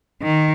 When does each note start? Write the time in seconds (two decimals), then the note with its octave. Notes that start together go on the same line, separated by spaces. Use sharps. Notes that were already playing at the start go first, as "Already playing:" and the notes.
0.22 D#3